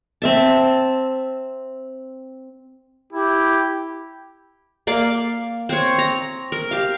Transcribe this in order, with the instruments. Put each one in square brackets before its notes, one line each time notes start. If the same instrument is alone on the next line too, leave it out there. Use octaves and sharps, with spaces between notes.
[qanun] C4 E5 A5
[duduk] E4 [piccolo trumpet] G4
[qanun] A#3 D5 F5
C4 C#5
A#5
A#4
G4 F5